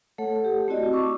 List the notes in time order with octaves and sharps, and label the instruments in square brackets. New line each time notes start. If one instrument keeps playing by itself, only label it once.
[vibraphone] A3 A4 C#5 F#5
G4
A3 C4 E4 F#4 D5 D#5
A5 C#6 D6 E6